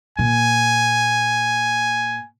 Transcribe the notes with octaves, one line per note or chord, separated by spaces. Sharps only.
A#2 G#5